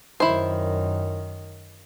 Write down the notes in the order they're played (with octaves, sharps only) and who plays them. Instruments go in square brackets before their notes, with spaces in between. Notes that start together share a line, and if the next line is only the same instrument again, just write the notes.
[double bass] F#2 D#3 [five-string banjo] E4 C5